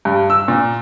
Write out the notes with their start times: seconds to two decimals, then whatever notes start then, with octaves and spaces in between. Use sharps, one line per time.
0.05 G2
0.30 E6
0.48 A#2